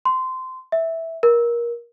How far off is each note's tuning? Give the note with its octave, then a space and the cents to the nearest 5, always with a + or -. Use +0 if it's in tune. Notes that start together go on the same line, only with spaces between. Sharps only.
C6 -20
E5 -10
A#4 +20